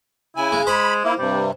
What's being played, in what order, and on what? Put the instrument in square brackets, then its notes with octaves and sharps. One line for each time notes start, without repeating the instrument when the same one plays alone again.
[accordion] C#3 G#5 [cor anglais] E4
[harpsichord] G#3
[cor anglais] G#3 [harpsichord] C5 [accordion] B5
[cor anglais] A#3 [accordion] E4
[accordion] G2 C3 [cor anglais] G3